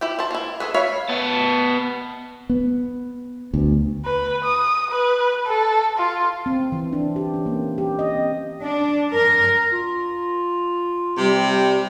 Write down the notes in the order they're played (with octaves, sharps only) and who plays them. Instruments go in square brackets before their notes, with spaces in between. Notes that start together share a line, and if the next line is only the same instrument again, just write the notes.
[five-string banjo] E4 G4 G5
E4 C5 A5
A#3 E4
G#4 A4 B4
C#5 E5 F5 B5
[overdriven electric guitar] B3 A5
[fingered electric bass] B3
D2
[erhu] B4
D#6
B4
A4
F4
[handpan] C4
E3
D4
G4
C#4
A#3
G4
D#5
C4
[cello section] D4
A#4
[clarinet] F4
[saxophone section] C3 [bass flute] G3